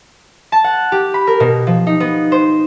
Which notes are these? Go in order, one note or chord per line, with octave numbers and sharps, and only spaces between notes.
A5
F#5
G4
B5
A#4
B2
F3
D#4
B3
C5